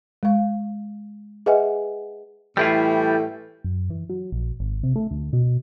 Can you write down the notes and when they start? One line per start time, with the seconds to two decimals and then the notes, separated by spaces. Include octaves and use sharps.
0.23 G#3 F5
1.46 G#4 B4 D#5 E5 F#5 G#5
2.57 A2 E3 G3 A3 E4 F4
3.64 F#2
3.90 E3
4.09 F#3
4.32 A#1
4.60 G#1
4.83 C3
4.96 A3
5.11 D2
5.33 B2